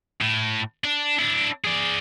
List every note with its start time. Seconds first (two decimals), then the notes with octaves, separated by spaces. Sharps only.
0.22 A2
0.84 D4
1.19 D4 E4
1.64 G#4 D5